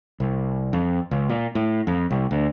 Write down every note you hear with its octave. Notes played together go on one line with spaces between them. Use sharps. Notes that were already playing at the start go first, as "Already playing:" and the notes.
C2
F2
C#2
A#2
A2
F2
C2
D2